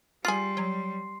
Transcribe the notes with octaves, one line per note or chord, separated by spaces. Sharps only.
G3 F4 G#4 C6 C7
F#3